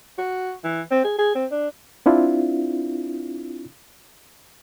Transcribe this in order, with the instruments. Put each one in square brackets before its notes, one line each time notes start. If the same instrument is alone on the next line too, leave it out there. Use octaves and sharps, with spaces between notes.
[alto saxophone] F#4
E3
C4
G#4
G#4
C4
D4
[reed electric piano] C4 D4 E4 F4